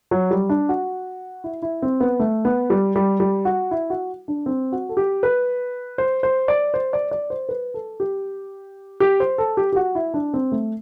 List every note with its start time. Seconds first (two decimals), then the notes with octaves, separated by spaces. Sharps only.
0.11 F#3
0.31 G3
0.49 D4
0.69 F#4
1.44 E4
1.62 E4
1.82 C4
2.00 B3
2.20 A3
2.45 B3
2.70 G3
2.96 G3
3.20 G3
3.45 F#4
3.71 E4
3.90 F#4
4.28 D4
4.46 C4
4.72 F#4
4.89 A4
4.97 G4
5.23 B4
5.98 C5
6.23 C5
6.48 D5
6.74 C5
6.93 D5
7.11 D5
7.30 C5
7.49 B4
7.74 A4
8.00 G4
9.00 G4
9.20 C5
9.38 A4
9.57 G4
9.73 G4
9.76 F#4
9.95 E4
10.14 D4
10.34 C4
10.52 A3